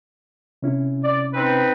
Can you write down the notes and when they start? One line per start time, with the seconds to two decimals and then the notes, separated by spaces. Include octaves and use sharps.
0.63 C3 C#4 E4
1.04 D5
1.34 C4 D#4 B4